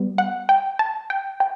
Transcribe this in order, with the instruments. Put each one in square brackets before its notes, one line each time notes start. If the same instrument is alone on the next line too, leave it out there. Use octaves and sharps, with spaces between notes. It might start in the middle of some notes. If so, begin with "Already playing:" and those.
Already playing: [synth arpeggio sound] G3 B3
F#5
G5
A5
G5
G5